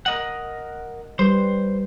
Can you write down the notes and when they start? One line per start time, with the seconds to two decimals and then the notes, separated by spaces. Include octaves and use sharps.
0.06 A#4 D#5 F#5
1.19 G3 B4 C5